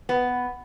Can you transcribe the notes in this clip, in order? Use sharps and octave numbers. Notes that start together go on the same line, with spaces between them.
B3